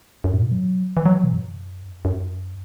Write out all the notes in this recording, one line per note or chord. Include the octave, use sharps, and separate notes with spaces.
F#2
A2
B2
F#3
E3
F#3
E3
B2
F#2
F#2